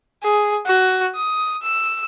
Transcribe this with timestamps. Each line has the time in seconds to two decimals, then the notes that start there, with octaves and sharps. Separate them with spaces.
0.23 G#4
0.66 F#4
1.15 D#6
1.63 E6